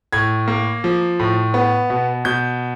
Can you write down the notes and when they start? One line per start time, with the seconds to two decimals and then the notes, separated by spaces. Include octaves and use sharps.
0.13 A2 G#6
0.48 A#3
0.84 F3
1.19 A2
1.54 B3
1.90 B2
2.25 B2 G6